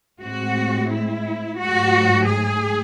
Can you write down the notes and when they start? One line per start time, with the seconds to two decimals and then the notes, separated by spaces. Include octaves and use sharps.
0.21 A2 G#3 C4 F#4
0.90 E4
1.57 G#2 F#3 A3 F#4
2.26 G#4